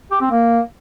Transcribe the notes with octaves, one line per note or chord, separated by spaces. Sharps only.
G4
C4
A#3